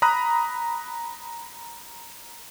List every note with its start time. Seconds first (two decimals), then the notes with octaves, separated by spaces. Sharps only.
0.02 A#5 B5 D#6 F#6